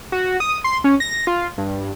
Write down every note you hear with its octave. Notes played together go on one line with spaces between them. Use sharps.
F#4
D#6
C6
C#4
A#6
F4
G2